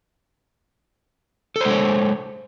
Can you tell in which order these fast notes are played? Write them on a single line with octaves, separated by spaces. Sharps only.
A4 C5 G#3 C#5